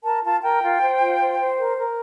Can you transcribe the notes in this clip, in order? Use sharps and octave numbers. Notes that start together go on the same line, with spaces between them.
A#4 A5
F4 A5
A#4 G5
F4
C5
F4
C5
C5
A#4
A#4